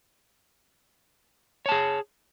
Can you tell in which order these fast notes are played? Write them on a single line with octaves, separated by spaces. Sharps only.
C#5 A5 G#4